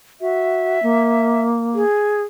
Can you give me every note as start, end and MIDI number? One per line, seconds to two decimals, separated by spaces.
0.21 0.82 66
0.21 1.42 76
0.83 1.83 58
1.75 2.23 68